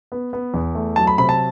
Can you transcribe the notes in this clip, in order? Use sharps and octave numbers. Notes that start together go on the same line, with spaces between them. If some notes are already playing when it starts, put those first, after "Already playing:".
B3
B3
E2
A3
F#3 A5
B5
C3 B5
A5